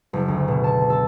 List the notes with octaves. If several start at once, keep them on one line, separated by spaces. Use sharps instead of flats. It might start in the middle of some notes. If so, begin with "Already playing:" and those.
F#1
D2
B2
A5
A4